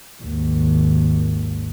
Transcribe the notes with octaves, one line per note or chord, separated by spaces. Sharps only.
G#1 D#2